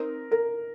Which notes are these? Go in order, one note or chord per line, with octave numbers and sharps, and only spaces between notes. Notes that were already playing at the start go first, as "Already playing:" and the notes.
Already playing: C4 D#4 A#4
A#4